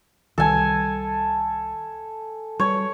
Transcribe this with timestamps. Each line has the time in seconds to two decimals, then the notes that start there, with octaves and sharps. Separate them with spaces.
0.38 C2 D#3 G3 A4 G#5
2.60 G3 C#5